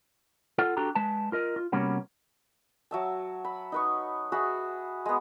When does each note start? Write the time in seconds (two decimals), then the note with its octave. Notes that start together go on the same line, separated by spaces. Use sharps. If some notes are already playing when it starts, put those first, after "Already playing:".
0.58 F4 A4 F#5
0.77 D4 F#4 G4 A4 A#5
0.95 G#3 B4 A5
1.32 F4 A#4 D#5
1.56 F4
1.72 C3 G3 A#3 B3 C#4 F#4
2.91 F#3 E5 A5
3.44 B5
3.72 D#4 B4 C#6
4.32 F#4 G#4 E5 B5
5.05 G#3 B3